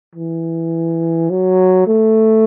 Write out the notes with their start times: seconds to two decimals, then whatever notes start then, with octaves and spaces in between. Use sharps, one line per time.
0.15 E3
1.30 F#3
1.87 A3